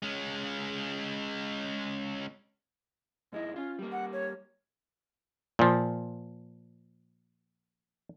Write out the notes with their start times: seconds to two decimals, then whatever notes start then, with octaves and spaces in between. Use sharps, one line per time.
0.02 G#3 C#4
3.32 G#2 G#3 E4 D#5
3.56 C#4 F4
3.79 G3 A#3
3.92 F#5
4.13 C#5
5.59 A#2 F3